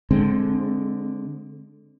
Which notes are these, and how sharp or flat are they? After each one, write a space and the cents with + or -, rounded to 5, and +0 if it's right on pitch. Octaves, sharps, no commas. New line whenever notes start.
D3 -5 G#3 +10 C4 +10